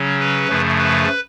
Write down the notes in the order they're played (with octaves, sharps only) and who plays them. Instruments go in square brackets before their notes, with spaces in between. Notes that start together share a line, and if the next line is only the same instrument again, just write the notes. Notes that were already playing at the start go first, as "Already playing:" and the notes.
Already playing: [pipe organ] C#3 F#3 C#4
B4
F#2 C#3 F3 A3
B4